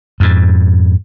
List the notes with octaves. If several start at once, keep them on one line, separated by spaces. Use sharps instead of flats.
F2 G#2